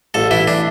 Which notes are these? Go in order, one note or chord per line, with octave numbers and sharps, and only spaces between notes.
A1 A4
E3 E4
D4